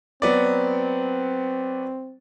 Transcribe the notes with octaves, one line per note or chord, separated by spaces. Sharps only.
F#3 B3 C4 D5